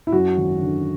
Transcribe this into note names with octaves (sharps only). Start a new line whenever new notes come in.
E4
F#2 F#4
G#1
D3